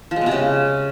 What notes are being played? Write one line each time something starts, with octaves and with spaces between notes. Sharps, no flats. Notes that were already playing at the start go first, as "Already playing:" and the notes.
F3
G#3
B2
C3
C#3